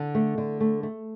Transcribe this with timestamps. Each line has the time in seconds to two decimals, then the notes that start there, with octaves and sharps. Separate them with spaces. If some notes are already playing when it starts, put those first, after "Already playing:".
Already playing: D3
0.15 A3
0.38 D3
0.60 A3
0.83 A3